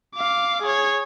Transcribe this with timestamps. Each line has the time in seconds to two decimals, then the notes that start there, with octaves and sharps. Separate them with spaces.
0.15 F5 D6
0.62 G#4 C#5